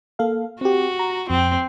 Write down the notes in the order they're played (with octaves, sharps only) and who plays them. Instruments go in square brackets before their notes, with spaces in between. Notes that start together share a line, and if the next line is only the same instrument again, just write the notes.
[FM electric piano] A#3 A4 F5
[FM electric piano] C4 G4 [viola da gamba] F#4
[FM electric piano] A#5
[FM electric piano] F2 [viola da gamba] C4